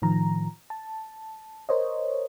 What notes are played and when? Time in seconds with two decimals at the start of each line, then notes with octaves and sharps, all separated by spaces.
0.02 A2 D#3 F3 A#5
0.70 A5
1.69 A#4 C5 C#5 D#5